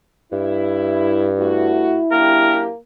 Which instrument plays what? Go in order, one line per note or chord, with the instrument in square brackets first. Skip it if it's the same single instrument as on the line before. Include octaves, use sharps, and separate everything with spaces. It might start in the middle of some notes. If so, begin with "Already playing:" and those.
[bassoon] G2 [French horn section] E4
[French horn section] A3 F#4 [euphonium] E4
[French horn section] F#2 D4 G4 [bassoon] A#3 [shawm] A#4